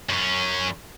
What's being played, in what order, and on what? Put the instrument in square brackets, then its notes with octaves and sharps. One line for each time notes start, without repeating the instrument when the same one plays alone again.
[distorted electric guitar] F#2 C#4